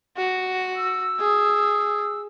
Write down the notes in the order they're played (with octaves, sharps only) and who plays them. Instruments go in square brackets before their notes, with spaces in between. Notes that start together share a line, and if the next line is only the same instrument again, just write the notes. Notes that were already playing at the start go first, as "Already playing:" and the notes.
[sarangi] F#4
[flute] E6
[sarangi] G#4